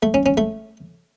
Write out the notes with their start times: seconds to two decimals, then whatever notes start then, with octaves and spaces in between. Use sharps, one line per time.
0.03 A3
0.14 C#4
0.26 C#4
0.37 A3